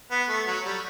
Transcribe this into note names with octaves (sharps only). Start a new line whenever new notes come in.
B3
A3
F#3
G3